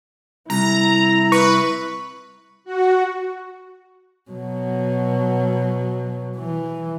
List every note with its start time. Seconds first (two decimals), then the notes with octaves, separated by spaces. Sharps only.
0.50 C2 E4 A#5
1.32 B4 C#6
2.64 F#4
4.30 B2 F#3
6.38 E3